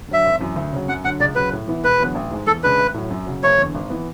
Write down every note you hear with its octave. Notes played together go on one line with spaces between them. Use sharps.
D3 F#3 E5
G#1
F#2 E3
D2
C#3 F#3
F#2 F#5
D3 F#3 F#5
C#2 D5
C#3 F#3 B4
A2
E3 B3 E4
E1 B4
E2 D3 F#3 B3
A1
G#2 G#3
E2 A4
C#3 G#3 D4 B4
A1
A2 F#3
F#2
C#3 F#3
F#1 C#5
E2 D3
G#1
E3 B3